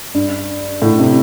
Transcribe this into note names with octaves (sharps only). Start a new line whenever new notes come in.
G2
A2
C3